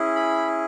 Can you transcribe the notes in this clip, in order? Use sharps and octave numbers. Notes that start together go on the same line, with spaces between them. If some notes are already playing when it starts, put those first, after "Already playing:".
Already playing: C#4 E4 G#4
B5